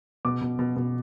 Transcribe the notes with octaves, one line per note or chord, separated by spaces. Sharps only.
B2 D6
B2
B2
B2